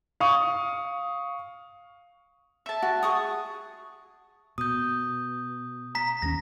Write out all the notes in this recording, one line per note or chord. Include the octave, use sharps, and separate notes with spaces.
F5 C#6 D#6
E5 A5
F#4
G#4 C#6 D#6
B2 D#6 G6
A#5 B6
D#2 A3 C#4 A#6